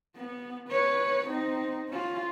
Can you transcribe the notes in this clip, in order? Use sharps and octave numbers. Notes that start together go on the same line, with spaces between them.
B3
B4 C#5
C4 D#4
C#4 F4